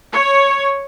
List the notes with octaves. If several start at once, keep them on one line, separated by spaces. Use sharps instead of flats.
C#5